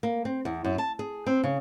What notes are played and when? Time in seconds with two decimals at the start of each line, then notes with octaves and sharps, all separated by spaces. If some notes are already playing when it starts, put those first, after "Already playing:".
0.03 A#3
0.25 C4
0.45 E2
0.64 F#2
0.78 A5
0.99 G#4
1.26 C4
1.44 C#3